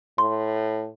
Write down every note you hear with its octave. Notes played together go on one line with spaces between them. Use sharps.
A2 C6